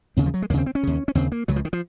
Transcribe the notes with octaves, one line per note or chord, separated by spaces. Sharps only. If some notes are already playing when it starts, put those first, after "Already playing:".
D#2 C#3 C4
F3
F#3
G#3
D#2 C#3 A#3 C4
C4
C#4
D#2 C#3
C#4
D#2 C#3 C4
A#3
C#2 C#3 F#3
F3
D#3
F3